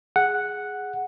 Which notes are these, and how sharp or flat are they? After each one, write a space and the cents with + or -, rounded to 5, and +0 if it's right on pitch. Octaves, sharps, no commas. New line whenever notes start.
G#4 +0 F#5 +0